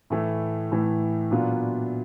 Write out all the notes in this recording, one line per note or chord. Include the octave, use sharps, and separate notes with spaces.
A2 E3 A3
A2 E3 A3
A#2 F#3 B3 D4 F4